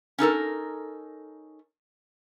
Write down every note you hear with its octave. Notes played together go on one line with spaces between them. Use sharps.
C#4 D#4 A4 A#4